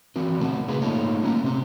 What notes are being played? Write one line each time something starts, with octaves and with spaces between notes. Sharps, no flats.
E3 C4 F#4 A#4
D2 B2 A3 F#5 A5
C#3 G#4 B4 F5
A3 A#3 D#4 F4 A4 C#5
A#3 C#4 A#5
C3 C4 C6